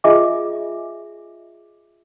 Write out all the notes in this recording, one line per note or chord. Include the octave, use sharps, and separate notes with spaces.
F4 G#4 D#5 E5 G#5 D6